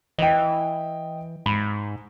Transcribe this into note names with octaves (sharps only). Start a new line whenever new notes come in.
E3 D#5 G5
G#2 B5